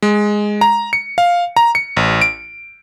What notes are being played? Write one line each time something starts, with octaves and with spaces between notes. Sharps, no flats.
G#3
A#5
C#7
F5
A#5
C#7
A1
D7